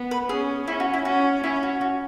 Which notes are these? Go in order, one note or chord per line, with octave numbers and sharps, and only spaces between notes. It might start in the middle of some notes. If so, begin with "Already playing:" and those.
Already playing: B3
B4
C#4 G#4
C#4 E4
F#4
E4
C#4 F#4
C#4 E4
F#4
F#4